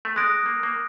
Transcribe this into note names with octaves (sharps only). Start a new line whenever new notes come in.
A3
G#3 D#6 F#6 A#6 D7
A#3
A#3